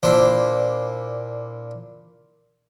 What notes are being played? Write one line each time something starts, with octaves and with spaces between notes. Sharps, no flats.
A#2 D4 E4 C5